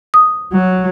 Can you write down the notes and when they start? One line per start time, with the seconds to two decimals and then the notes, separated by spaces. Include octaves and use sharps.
0.14 D#6
0.53 F#3